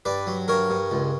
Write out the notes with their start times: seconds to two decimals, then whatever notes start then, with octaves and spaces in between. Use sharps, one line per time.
0.05 G2 B4 D5
0.27 F#3
0.48 G2 A#4 C#5
0.70 G2
0.91 C#2